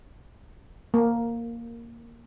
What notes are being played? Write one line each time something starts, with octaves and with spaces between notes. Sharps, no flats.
A#3